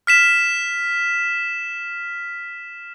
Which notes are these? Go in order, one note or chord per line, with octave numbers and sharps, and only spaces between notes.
F6 B6 E7